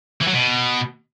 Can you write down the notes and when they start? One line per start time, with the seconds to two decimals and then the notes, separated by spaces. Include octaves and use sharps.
0.21 E3
0.28 F#3
0.34 B2